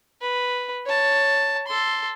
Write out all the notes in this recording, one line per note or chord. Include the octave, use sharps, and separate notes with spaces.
B4
C#5 A5
A4 C6